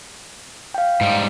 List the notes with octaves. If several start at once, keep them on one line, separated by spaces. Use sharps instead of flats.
F5 G5
G#2 G3